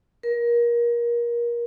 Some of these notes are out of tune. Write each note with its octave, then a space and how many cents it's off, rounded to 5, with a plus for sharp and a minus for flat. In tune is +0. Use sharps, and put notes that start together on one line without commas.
A#4 +25